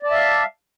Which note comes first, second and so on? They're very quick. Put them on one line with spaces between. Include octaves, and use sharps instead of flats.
D5 A5 E5 F5